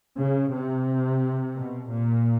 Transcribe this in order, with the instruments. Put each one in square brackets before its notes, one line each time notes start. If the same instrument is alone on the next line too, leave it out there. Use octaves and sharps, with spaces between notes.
[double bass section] C#3
C3
B2
A#2